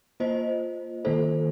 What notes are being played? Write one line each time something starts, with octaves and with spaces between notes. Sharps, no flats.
A#3 F4 C5 D#5
D#3 A#3 F4 A4 C5